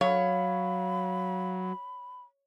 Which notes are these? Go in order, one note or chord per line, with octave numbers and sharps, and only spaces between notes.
F#3 C#5 F5 B5